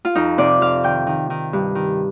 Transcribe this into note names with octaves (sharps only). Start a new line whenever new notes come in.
F4
F2 D#4
C3 D5
F2 F5
D#3 G5
D#3
D#3
G2
D#3